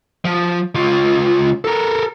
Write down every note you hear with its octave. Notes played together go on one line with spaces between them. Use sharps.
F3
C#2 F4
A4 A#4